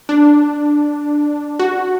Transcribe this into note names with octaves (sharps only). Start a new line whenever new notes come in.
D4
F#4